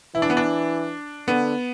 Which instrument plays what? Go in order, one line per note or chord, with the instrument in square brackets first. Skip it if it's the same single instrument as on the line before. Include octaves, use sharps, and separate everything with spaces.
[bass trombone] E3 [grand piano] E4
[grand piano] D4
B3
D4
[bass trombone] D3 [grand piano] B3